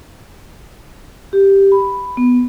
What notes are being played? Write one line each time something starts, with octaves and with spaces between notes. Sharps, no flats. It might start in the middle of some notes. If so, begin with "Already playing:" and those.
G4
B5
B3